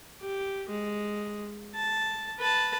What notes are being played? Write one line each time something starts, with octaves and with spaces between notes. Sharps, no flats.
G4
G#3
A5
B4 A5